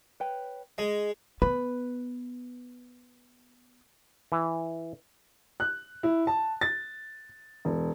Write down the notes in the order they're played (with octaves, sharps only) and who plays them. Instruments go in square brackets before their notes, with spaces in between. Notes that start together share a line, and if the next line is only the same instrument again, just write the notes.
[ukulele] B4 C#5 G5
[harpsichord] G#3 [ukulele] D#5
[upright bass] B3 [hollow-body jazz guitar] B4
[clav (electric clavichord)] E3
[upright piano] F#6
E4
A5
A6
E1